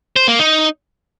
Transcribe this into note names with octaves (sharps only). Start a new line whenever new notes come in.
C5
A#3
D#4